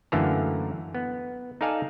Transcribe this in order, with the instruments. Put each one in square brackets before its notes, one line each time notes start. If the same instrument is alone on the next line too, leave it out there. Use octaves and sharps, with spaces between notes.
[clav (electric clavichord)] F#2 D3 E3 A3 A#3 A#5
B3
D#4 A4 D5 F5 G#5 A5